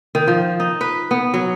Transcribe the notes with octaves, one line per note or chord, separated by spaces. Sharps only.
D#3
F3
D#4
B4
B3
F#3